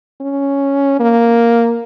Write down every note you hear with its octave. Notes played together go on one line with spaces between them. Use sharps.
C#4
A#3